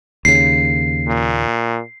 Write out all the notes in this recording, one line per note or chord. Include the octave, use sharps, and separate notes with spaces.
D#2 C#3 C7
A#2